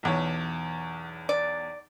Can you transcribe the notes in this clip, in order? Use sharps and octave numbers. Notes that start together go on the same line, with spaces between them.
B1 E2 C#5
D5